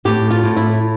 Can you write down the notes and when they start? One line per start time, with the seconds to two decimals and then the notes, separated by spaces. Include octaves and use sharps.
0.05 A2 G4
0.31 F4
0.44 A2
0.57 E4